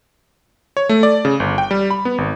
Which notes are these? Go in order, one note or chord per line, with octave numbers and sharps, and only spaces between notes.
C#5
A3
D5
C#3
G1
G5
G3
B5
B3
G#1